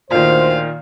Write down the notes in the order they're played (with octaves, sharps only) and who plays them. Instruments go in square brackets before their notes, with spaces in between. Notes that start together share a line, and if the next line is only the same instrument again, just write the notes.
[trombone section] D2 C5 [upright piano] A#2 D#3 [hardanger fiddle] F5